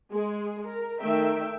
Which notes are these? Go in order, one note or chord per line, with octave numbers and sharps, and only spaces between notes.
G#3 G#4
A#4
D#3 A3 E5 G5